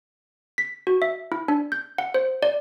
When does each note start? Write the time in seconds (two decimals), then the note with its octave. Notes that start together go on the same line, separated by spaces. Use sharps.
0.58 B6
0.87 F#4
1.02 E5
1.32 E4
1.48 D4
1.72 G6
1.98 F#5
2.14 C5
2.43 D5